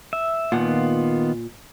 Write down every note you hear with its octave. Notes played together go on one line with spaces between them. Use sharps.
E5
A#2 D#3 B3 F4 F#5